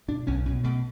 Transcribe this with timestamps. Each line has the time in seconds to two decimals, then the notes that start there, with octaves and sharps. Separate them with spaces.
0.08 B2 D4
0.27 B1 C#4
0.46 B2 C#4
0.64 B2 A3